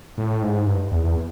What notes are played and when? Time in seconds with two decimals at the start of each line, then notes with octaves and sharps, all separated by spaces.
0.18 A2
0.42 G#2
0.66 G2
0.92 E2
1.04 E2